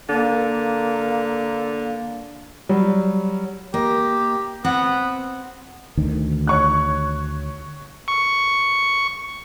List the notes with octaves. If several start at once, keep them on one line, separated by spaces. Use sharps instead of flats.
D3 A#3
F#3 G3
A#3 G4 D#5
B3 C4 F#5
D2 D#3
C#5 C#6 F#6
C#6